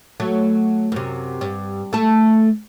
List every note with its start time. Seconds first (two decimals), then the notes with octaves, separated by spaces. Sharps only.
0.20 F#3 A3
0.92 F#2 C3
1.41 G2
1.93 A3 A4